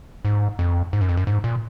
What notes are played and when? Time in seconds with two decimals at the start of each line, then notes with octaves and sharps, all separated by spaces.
0.25 G#2
0.59 F2
0.93 G#2
1.01 F#2
1.09 F2
1.17 F#2
1.27 G#2
1.44 A#2